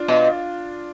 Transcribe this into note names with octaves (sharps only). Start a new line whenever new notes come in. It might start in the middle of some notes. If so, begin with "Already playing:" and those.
Already playing: D4 F4
B2